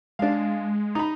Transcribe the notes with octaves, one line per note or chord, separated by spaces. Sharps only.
G#3 D4 F5
D#4 B5